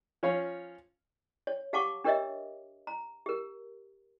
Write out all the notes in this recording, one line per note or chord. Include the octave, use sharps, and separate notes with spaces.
F3 C#4 C#5 F5
C#5
G4 F5 F#5 A5 C#6 D6
D4 G4 A#4 C#5 D#5 E5
A#5
G4 A#4